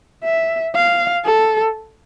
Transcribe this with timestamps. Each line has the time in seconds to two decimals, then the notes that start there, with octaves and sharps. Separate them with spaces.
0.24 E5
0.75 F5
1.25 A4